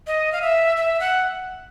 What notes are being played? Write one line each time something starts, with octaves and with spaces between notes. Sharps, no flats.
D#5
F5
E5
E5
F#5